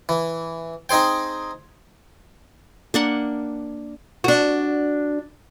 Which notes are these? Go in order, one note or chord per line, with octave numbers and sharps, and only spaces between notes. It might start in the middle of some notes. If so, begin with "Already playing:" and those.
E3
C4 D#4 G#4 C5 G5
A#3 D4 F#5
D4 F#4